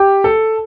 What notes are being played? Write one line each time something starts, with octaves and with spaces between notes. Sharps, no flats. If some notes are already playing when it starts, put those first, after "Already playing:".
Already playing: G4
A4